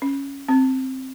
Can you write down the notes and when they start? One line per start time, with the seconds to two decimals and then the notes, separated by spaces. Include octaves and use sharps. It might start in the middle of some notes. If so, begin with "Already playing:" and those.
0.02 C#4
0.48 C4